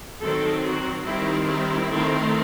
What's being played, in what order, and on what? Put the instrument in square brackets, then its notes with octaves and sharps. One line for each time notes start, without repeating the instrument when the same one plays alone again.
[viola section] D#3 F#3 C4 A4
F#4
D#3 G3 C4 E4
E4
D#3 A3 C4